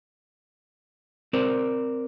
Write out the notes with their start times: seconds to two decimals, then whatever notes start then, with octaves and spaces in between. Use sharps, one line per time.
1.33 C4 A#4 C5 D5